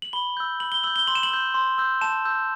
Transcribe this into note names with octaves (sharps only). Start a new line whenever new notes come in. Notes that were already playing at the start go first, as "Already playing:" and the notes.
F#7
B5 G7
E6 G6
B5 F#7
G7
E6 G6 F#7
G7
C6 F#7
E7
F#7
E6 G6
C6
E6 G6
A5 E7
E6 G6